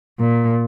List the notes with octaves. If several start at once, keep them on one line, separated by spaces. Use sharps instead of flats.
A#2